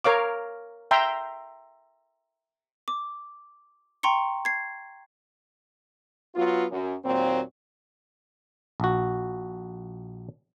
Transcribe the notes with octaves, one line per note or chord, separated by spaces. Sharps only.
A#4 C#5 F5 D6
E5 G5 A#5 C6
D6
G5 A#5 C6 C#6 C#7
G#6 C7
F#3 B3 F4
F#2
D#2 A#2 F#3 C4
A#1 F#4